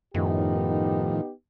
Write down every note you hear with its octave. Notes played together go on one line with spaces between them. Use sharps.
F#2 A2 D#3 F3 B3 D#4 G4